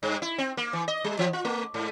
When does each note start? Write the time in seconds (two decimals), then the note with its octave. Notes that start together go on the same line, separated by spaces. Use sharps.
0.03 G2
0.22 E4
0.38 C4
0.57 A#3
0.73 E3
0.88 D#5
1.04 G3
1.19 E3
1.33 F4
1.45 A3
1.74 G#2